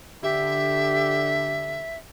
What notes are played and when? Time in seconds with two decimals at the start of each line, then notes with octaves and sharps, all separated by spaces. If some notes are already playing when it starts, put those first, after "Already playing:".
0.23 D3 G4 E5